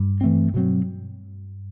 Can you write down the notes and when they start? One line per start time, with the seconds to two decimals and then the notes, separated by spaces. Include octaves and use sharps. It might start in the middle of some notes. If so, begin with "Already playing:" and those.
Already playing: G2
0.21 E3 A3 C4
0.54 B2 F#3 C4